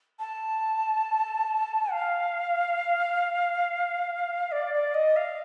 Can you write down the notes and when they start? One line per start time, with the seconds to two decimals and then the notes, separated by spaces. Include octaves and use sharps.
0.19 A5
1.92 F5
4.51 D5
4.74 D5
4.94 D#5
5.16 F5